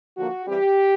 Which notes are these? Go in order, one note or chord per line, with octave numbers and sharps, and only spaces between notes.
D3 F3 A#3 F#4
E3 G3 C4 G4